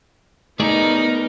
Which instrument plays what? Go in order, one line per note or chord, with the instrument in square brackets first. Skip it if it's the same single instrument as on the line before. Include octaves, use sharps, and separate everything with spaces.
[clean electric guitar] A3 G#4 D5 [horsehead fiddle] B3 A#4 [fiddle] D#4